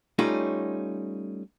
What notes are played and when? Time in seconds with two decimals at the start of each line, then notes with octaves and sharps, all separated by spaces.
0.19 G3 A3 C#4 D#4 F4